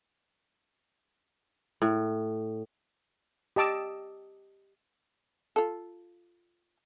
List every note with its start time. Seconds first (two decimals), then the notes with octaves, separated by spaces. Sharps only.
1.82 A2
3.56 G4 D#5 A5 D6 E6
5.56 F4 A4